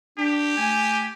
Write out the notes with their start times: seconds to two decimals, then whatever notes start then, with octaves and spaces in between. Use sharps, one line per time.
0.18 D4 G4
0.57 A3 G#5